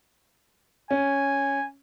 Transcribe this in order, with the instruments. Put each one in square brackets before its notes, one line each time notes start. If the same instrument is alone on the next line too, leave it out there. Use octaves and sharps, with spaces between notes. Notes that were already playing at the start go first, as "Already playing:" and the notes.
[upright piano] C#4 [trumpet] G#5